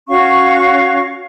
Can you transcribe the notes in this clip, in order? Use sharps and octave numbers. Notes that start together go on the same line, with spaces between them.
C#4 F#4 F5 C#6